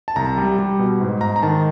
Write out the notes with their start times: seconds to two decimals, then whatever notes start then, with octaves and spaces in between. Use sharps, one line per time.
0.08 A5
0.16 C2 A#5
0.37 G3
0.59 G3
0.79 B2
1.01 G#2
1.21 G#2 A#5
1.36 A#5
1.42 D#3 A5